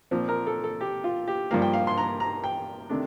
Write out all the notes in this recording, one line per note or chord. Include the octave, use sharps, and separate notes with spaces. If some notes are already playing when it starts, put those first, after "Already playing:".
A#2 F3 C4
A#4
A4
A4
G4
F4
G4
G2 F3 A#3 F5
G5
F5
C6
A#5
A#5
G5
C3 D#3 A3 D4